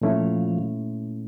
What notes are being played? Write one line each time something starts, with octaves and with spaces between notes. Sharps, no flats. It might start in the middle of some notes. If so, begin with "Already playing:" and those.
A#2 F3 A3 C#4 E4